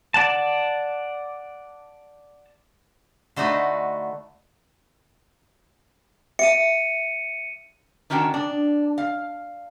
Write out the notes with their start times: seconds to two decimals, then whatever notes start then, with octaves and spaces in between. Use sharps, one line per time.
0.14 D5 F#5 A5
3.36 D3 A3 D4 D#4 F#4 B4
6.39 E5 C#7 D#7
8.10 D#3 C#4 D4 F#4 G5 A5
8.34 D4
8.98 F5